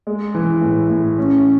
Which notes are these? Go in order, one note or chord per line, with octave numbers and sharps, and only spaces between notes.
G#3
E3
A2
A2
C#4